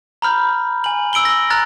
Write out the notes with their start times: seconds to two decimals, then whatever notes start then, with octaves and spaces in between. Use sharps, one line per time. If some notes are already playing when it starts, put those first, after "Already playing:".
0.22 A#5 B5 F6 G6
0.84 G#5 F#7
1.13 E6 D7 F#7 G7
1.25 E6 A#6
1.50 A#5 F6 F#6 A6